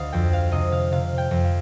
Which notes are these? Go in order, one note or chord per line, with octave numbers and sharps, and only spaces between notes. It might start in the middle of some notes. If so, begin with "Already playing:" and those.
Already playing: D2 D3 D#5 F5
F2 G5
F5
C3 D#5
F5
C3 F5
G5
F2
F5